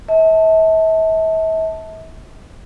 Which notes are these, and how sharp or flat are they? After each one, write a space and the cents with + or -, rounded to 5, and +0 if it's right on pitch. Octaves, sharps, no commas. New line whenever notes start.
E5 -40 A5 +0